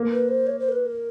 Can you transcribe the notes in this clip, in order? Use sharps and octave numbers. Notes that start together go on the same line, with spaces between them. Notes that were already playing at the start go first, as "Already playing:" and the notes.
Already playing: A#3
B4
C5
C#5
C5
A#4
B4
A#4